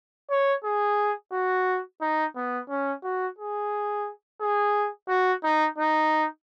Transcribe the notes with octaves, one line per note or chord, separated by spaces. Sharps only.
C#5
G#4
F#4
D#4
B3
C#4
F#4
G#4
G#4
F#4
D#4
D#4